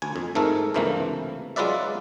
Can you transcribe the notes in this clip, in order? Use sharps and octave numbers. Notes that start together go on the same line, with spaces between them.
D2 G#5
F2
G#2 A3 A4 A#4
C#2 G2 C3 E3 A3 A#3
F#3 G#3 F4 B4 D5 E5